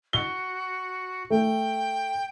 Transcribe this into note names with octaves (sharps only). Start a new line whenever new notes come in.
F#4 G7
A3 G5